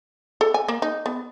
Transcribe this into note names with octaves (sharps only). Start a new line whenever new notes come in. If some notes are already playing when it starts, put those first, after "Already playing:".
A4
G#5
A#3
D#4
B3